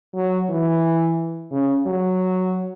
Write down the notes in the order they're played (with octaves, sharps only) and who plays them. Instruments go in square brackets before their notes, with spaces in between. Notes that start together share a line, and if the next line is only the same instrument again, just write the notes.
[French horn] F#3
E3
C#3
F#3